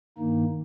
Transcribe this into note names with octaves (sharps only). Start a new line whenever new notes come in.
G2 D#3 A#3 D#4